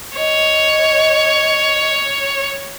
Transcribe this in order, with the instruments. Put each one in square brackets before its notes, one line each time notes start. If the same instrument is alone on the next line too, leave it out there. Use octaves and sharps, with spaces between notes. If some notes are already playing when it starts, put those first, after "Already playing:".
[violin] C#5 [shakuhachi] D#5